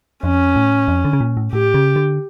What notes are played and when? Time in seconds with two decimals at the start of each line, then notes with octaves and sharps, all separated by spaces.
0.23 F2 C#4
0.56 A2
0.88 F2
1.05 D3
1.13 C#3
1.21 A#2
1.37 A2
1.53 A2 G4
1.74 C#3
1.96 D3